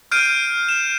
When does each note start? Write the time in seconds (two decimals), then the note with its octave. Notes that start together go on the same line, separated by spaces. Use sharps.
0.12 F6 G6 C7 D7 D#7
0.69 E7